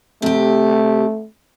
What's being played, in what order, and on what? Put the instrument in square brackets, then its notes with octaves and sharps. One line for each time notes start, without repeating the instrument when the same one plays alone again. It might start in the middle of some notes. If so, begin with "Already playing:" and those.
[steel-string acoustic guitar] C3 G4 [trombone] A3